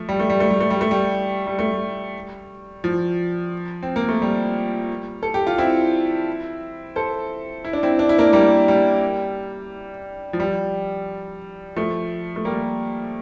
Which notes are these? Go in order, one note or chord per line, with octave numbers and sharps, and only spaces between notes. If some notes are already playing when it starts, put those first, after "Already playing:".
Already playing: F3 A3
G3
A3
G3
A3
G3
A3
G3
A3
G3
G3
A3
G3
F3
C4
A#3
A3
G3
A4
G4
F4
C4 E4
A4 C5
E4
D4
C4 E4
D4
E4
A#3 D4
G3 A#3
G3
F3
G3
F3 A3
A3
G3 A#3